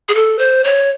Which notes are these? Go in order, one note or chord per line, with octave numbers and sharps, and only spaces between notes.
G#4
A4
C5
C#5